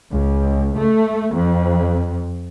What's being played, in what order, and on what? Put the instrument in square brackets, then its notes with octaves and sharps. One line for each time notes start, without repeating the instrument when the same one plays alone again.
[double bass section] C#2
A3
F2